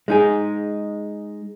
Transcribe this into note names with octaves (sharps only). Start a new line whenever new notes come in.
G#3 D#4 G#4